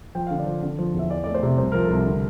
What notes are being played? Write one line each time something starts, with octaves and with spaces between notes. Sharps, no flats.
F3 G5
D3 F5
D5
F3
D3
F3
E2 E5
E3 D5
A3 D5
C5
C3
C2 C5
F3 A#4
A4
C2
A#4
D3